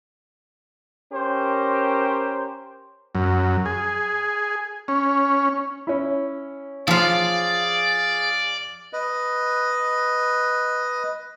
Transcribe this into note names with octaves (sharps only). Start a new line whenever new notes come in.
C#4 G4 A#4 C5
F#2
G#4
C#4
C#4 E4
F3 F4 G#4 D5 F5
B4 D#5